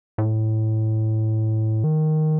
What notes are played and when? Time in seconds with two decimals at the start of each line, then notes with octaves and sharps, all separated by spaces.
0.18 A2
1.84 D#3